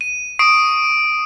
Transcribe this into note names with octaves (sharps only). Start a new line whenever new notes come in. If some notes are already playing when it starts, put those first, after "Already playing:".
D#7
C#6 D#6 C7 D7